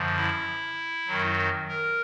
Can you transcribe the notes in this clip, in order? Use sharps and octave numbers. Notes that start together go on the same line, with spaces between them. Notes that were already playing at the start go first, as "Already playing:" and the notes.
Already playing: F#2 D3 F3
E4
F#2 D#3 F#3
A#4